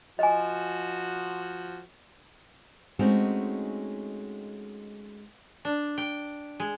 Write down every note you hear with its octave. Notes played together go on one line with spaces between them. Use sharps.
F3 F#4 D#5 G#5
G#3 A3 C4 C#4 D#4 F#4
D4
G5
G#3